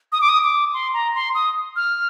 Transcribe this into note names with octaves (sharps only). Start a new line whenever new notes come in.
D#6
D6
D#6
D6
C6
A#5
C6
D#6
F6